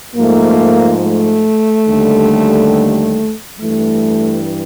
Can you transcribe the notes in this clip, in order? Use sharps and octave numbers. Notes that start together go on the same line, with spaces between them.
G#2 F3 A3 A#3
A3
D#2 D3 G3
G2 E3 A3